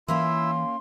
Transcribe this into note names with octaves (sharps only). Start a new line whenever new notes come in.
E3 A#3 C#4 E4 F4 E5 C6